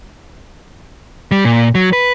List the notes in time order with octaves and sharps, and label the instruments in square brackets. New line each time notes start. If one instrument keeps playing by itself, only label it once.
[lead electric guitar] G3
A#2
F#3
B4